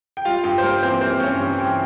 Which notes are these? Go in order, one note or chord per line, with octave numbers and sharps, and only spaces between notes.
G5
G3 F4 F5
G2 G4 G5
C5
G3 A#3 A#4
E3 C4 C5
E3 C4 C5
G2 C#4 C#5
G2
E3 G4 G5